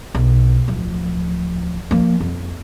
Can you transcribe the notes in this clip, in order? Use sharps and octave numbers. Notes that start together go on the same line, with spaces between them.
B1
D1 F3
F3 A#3
F2